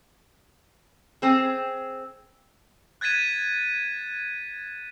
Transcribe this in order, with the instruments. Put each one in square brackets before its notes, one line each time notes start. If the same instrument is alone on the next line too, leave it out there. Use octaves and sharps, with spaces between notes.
[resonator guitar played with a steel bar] C4 G#4
[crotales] F#6 G#6 A6 B6 D#7 E7